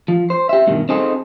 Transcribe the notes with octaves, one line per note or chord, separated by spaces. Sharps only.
F3
C5
G4 E5
G2 B2 D#3
C4 D#4 F#4 G#4 A4 C5